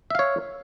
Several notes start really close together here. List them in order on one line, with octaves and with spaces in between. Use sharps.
E5 F5 C#5